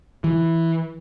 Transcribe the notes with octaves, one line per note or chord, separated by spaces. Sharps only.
E3